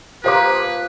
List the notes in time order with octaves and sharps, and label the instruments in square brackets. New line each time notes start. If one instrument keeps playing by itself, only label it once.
[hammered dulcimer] F3 A#3 [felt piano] G4 C5 D6 [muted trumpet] B4